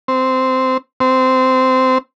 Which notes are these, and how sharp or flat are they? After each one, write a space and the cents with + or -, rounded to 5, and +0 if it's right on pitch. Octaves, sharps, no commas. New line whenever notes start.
C4 -10
C4 -15